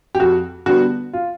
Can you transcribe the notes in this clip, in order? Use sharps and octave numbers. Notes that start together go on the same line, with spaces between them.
G4
F2 F#4
D3 G3 B3 F#4
F4